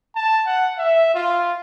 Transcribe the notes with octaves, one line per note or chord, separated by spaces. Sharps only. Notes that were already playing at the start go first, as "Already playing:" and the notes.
A5
F#5
E5
F4